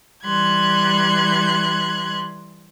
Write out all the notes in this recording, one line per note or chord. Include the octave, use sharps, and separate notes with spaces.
E3 G3 C6 F#6 G#6